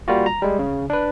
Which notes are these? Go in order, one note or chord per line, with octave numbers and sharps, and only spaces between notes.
G3 A#3 F4 F#4
A#5
G3 G#3
C#3
D4 B4